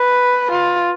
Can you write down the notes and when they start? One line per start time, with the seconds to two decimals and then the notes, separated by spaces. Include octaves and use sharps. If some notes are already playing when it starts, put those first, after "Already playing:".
Already playing: B4
0.52 F4